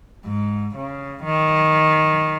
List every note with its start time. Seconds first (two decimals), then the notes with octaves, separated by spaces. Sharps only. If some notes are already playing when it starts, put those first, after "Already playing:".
0.25 G#2
0.76 C#3
1.24 D#3